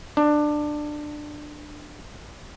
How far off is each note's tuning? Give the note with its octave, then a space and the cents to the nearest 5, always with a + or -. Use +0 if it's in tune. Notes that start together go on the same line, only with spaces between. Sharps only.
D4 +15